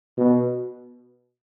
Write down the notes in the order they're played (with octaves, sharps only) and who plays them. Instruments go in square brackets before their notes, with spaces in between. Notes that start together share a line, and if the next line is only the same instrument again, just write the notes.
[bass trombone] B2